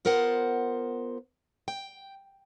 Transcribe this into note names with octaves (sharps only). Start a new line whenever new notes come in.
B3 F4 A#4 C5 F#5
G5